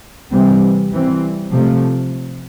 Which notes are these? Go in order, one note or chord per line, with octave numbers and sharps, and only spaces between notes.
C3 E3 G3 C4
E3 G3 C4
C3 F3 A3